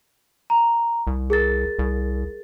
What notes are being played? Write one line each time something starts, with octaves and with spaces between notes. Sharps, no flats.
A#5
C2
G#4 A#4 A6
C2